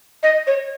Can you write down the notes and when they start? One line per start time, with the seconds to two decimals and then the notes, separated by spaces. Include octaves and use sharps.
0.23 D#5
0.47 C#5